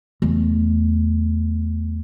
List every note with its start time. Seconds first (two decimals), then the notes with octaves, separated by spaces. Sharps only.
0.22 E2 A3